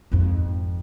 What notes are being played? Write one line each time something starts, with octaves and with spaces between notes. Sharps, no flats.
G#1 F2